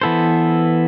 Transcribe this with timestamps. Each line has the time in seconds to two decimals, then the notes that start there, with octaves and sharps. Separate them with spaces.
0.02 E3 B3 E4 A4 C5